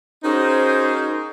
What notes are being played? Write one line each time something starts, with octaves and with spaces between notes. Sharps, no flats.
C#4 D#4 F#4 G#4 A#4 C5